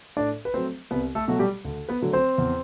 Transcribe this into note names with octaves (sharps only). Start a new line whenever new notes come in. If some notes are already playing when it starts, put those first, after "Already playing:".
A2 D4 D5
B4
F#3 A3 C4 C5
C2 B3 B4
A3 A4
B2 F#3 A3 F#4
G3 G4
D2
B3 B4
D3 F#3 A3
C4 C5
E2